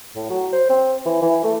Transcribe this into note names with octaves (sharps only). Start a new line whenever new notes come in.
A2
F#3
C5
C4
E3
E3
A3